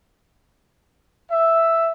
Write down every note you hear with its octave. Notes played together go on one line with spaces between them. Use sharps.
E5